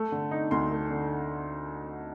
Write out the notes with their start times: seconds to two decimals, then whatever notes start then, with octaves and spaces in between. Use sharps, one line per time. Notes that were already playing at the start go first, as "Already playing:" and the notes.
Already playing: A3
0.12 D3
0.31 D#4
0.51 D2 C6
0.70 A3
0.90 D3